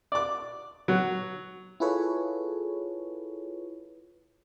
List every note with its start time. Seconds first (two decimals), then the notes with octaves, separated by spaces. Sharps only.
0.12 D5 D6
0.88 F#3
1.80 E4 F4 G#4 A4 B4 C#5